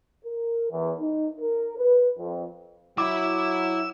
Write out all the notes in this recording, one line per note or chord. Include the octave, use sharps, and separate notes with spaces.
A#4
E2
D#4
A#4
B4
F2
F#3 E4 E5 D6 E6